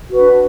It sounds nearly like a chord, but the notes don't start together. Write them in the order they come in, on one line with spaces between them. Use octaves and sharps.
F#4 B4 D4